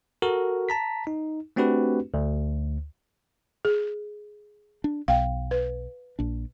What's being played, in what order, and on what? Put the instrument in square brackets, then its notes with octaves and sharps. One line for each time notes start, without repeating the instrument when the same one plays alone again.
[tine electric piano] F#4 A4 A#4
A5 A#5 B6
D#4
A3 C4 D4 F#4 G4 B4
D2
[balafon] G#4
[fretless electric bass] D4
[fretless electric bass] B1 [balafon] F5 G5
[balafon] B4
[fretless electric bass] A#1 D4